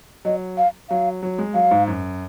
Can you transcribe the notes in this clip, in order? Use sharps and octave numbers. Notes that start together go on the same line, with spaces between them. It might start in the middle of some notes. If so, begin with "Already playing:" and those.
F#3 D#5
F5
F#3 F5
F#3
G#3
F#3 F5
G#2
F#2